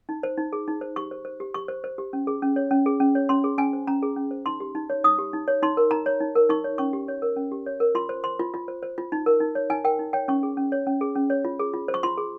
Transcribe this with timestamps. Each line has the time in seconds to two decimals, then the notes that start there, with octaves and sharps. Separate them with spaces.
0.09 D#4
0.23 C5
0.37 D#4
0.53 G#4
0.68 D#4
0.81 C5
0.96 G4 C#6
1.11 C5
1.25 C5
1.40 G4
1.54 G4 C#6
1.68 C5
1.84 C5
1.98 G4
2.13 C#4
2.27 G#4
2.42 C#4
2.56 C#5
2.71 C#4
2.86 G#4
3.00 C#4
3.15 C#5
3.29 C#4 C6
3.44 G#4
3.58 C#4 G#5
3.73 C5
3.87 C#4 A#5
4.03 G#4
4.16 C#4
4.31 C5
4.46 D#4 C6
4.60 G4
4.75 D#4
4.90 C#5
5.04 D#4 D#6
5.19 G4
5.33 D#4
5.48 C#5
5.62 D#4 C6
5.77 A#4
5.91 D#4 A#5
6.06 C#5
6.20 D#4
6.35 A#4
6.49 D#4 C#6
6.64 C#5
6.78 C#4 C#6
6.93 G4
7.08 C#5
7.22 A#4
7.36 C#4
7.52 G4
7.66 C#5
7.80 A#4
7.95 F4 C6
8.09 C5
8.24 C5 C6
8.39 F4
8.54 F4
8.68 C5
8.83 C5
8.98 F4
9.12 D#4
9.26 A#4
9.40 D#4
9.55 C#5
9.70 D#4 G#5
9.84 A#4 G5
9.99 D#4
10.13 C#5 G5
10.28 C#4 C#6
10.43 G#4
10.57 C#4
10.72 C#5
10.86 C#4
11.01 G#4
11.16 C#4
11.30 C#5
11.45 F4
11.59 G#4
11.74 F4
11.88 C5
11.94 C#6
12.03 F4 C6
12.17 G#4